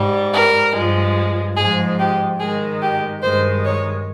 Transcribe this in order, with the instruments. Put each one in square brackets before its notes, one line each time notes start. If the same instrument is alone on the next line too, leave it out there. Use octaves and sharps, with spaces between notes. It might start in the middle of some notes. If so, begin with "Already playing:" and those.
Already playing: [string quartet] G#2 G3
A#4
G2 F3 G#3
G#2 F3 G#3 G#4
G4
G#2 D#3 G#3 G#4
G4
G2 D#3 G#3 C5
C#5